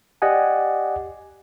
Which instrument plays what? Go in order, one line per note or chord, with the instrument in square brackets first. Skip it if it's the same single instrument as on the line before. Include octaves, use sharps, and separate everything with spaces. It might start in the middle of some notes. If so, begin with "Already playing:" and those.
[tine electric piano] G4 D5 D#5 F#5 G#5